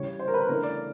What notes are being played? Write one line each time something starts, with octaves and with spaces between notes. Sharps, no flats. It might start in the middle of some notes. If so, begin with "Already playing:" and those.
Already playing: C#3 E3 G3 C#5
C5
A#4
B4
C#3 E3 A3 D4 A#4
D5